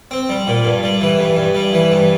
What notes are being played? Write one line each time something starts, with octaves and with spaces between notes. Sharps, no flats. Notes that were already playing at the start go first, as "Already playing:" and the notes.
C4
G3
A#2
G2
G3
E3
G2
G2
G3
E3
G2